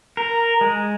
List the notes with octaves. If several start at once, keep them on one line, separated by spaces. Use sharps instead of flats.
A#4
G#3